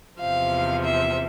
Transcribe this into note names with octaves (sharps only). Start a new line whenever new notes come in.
E2 C3 F3 F5
E5